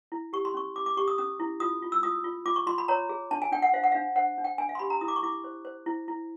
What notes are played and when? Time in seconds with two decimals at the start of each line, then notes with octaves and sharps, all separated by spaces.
0.12 E4
0.33 G4 C#6
0.45 C6
0.54 C#4 C#6
0.76 G4 D6
0.86 D6
0.97 G4 C#6
1.08 D#6
1.18 C#4 D#6
1.40 E4
1.60 F4 D#6
1.82 F4
1.92 E6
2.03 F4 D#6
2.24 F4
2.46 F4 D6
2.56 C#6
2.67 F4 C6
2.78 B5
2.88 C#5 A#5
3.09 G#4
3.31 D4 A5
3.42 G#5
3.52 D4 G5
3.62 F#5
3.74 C5 F5
3.83 F#5
3.92 D4 F5
4.16 C5 F#5
4.38 D4
4.44 G5
4.58 D4 G#5
4.69 F5
4.75 C6
4.79 G4 B5
4.90 A#5
5.01 E4 D#6
5.08 D6
5.16 C#6
5.23 E4 D6
5.44 C5
5.65 C5
5.86 E4
6.08 E4